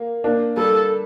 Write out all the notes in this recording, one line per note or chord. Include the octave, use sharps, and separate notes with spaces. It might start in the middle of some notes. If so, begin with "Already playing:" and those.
Already playing: A#3
A#3 D4
G3 A4